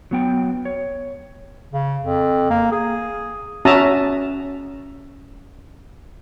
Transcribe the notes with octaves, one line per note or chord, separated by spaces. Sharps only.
F#3 B3 G5
C#5
C#3
F2
A#3
G#4
C#4 F#4 E5 A5 A#5 D#6